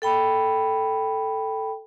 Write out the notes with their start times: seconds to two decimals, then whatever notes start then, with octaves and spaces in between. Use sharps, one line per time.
0.02 A4 G5 B5